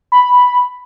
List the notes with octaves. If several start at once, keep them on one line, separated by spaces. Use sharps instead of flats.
B5